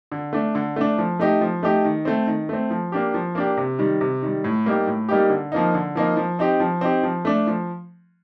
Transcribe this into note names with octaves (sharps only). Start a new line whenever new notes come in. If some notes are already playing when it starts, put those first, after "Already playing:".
D3
A3 D4
D3
A3 D4
F3
A3 D#4 G4
F3
A3 D#4 G4
D#3
A3 C4
D#3
A3 C4
F3
A#3 D4 G4
F3
A#3 D4 G4
C3
D#3 G3
C3
D#3 G3
A2
G3 A#3 D#4 G4
A2
G3 A#3 D#4 G4
D3
F3 A#3 D#4
D3
F3 A#3 D#4
F3
C4 D#4 G4
F3
C4 D#4 G4
F3
A3 D4
F3